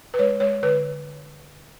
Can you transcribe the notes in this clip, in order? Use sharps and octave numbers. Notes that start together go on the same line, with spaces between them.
B4
G#3 C#5
G#3 C#5
D3 B4